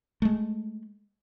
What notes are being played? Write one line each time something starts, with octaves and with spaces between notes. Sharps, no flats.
G#3 A3